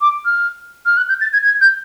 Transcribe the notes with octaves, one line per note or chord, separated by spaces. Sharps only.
D6
F6
F6
F#6
G6
A6
G#6
G#6
G6